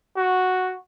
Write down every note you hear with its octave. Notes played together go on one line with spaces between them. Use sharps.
F#4